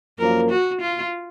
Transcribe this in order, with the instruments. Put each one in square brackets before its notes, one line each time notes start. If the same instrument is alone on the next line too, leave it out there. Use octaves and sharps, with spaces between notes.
[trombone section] F#2 F3 A#3 [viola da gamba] A#4
[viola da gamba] F#4
F4